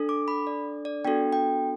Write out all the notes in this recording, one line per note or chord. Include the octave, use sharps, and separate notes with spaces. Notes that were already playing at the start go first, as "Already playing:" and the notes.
Already playing: D4 A4
D6
B5
D5
D5
B3 D4 F#4 A4 G5
G5